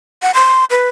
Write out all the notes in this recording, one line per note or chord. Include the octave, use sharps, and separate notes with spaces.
F#5
C6
B4